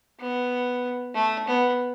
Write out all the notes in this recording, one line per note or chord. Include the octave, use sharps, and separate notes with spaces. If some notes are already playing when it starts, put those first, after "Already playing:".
B3
A3
B3